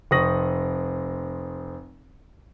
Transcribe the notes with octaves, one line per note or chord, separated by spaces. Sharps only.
F1 C4 C#6 D#6 A#6 F#7